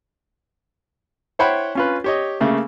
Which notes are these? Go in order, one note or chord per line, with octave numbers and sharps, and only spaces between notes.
E4 C5 C#5 F#5 G5 B5
C#4 F4 B4
G4 C#5 D#5
C#3 A3 A#3